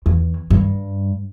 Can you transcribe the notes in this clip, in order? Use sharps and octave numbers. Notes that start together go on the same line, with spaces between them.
E2
G2